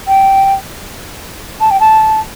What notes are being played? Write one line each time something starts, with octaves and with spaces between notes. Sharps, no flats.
G5
A5
G5
A5